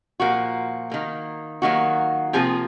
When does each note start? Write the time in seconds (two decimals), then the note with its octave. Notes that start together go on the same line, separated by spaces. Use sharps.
0.20 A#2 F3 A#3 F#4
0.91 D#3 A#3
1.62 D#3 F#3 A#3 F#4
2.33 C3 F3 A#3 G#4